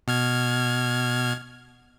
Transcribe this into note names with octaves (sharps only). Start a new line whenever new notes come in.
B2 F6 G#6